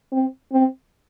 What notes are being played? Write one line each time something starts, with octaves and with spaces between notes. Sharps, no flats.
C4
C4